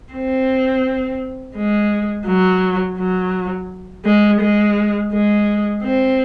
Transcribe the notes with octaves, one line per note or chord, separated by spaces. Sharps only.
C4
G#3
F#3
F#3
G#3
G#3
G#3
C4